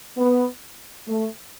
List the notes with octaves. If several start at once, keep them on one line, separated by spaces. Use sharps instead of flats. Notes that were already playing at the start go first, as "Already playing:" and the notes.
B3
A3